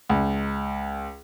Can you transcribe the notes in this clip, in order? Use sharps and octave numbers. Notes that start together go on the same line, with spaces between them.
C#2